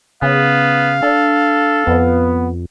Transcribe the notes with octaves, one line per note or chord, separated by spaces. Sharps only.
C#3 B3 F5
D4 A4
F2 B3